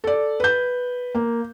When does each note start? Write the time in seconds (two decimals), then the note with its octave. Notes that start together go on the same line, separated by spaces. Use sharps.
0.04 A4 D5
0.40 B4 G6
1.15 A#3